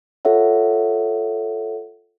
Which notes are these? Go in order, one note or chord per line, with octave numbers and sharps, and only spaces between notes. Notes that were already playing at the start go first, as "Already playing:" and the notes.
F4 A4 C#5 E5 F#5